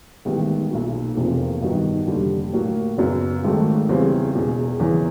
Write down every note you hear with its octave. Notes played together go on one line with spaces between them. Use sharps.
A1 G#2 D#3 G3 B3
B1 A#2 F#3
F1 E2 C3 F3 A#3
G2 D#3 F#3 B3 D#4
F1 D#2 D3 G3
A2 F#3 A#3
F#2 C#3 F#3 B3
G#1 G#2 D#3 F#3 A3
E2 C#3 E3 G3 C4
E1 E2 B2
E2 C#3 E3